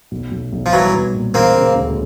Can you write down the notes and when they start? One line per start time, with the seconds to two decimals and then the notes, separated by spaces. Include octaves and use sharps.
0.11 B1
0.31 B1
0.52 B1
0.66 F3
0.73 E3 F#3 G3
0.93 B1
1.14 A#2
1.34 E1 A#3 C4
1.55 C#3
1.75 D2